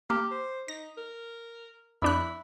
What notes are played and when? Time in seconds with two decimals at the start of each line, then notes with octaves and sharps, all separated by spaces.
0.10 A#3 G4 D6 F6
0.31 C5
0.68 D#4 A#6
0.97 A#4
2.02 F2 D4 E4 B5 F#6